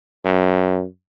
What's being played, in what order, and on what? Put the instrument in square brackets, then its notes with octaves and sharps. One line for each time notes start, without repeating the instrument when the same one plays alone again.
[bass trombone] F#2